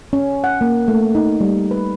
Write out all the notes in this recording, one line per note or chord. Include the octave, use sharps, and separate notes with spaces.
C#4
F#5
A#3
A3
D#4
G3
B4